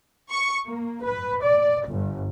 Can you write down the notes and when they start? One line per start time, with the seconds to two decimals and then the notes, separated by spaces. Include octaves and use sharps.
0.30 C#6
0.67 A#3
1.03 B4
1.43 D5
1.88 G1